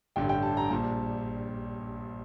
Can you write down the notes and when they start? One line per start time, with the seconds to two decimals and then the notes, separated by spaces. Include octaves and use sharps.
0.16 A1 G2 D3 G5
0.29 G5
0.42 A5
0.57 A#5
0.70 A#1 A#2 G3 A5